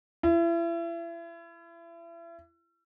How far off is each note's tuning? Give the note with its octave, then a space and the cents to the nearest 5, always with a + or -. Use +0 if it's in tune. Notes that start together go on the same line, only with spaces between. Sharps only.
E4 +35